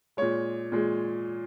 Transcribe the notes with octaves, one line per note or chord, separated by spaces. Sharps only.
A#2 G#3 C#5
A#2 G#3